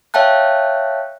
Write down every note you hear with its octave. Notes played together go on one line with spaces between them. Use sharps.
C#5 E5 F5 G5 A5 F#6